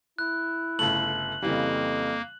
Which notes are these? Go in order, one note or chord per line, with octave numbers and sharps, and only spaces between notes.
E4 F#6
G1 C#3 A3 F#7
F2 C#3 E3 G3 A#3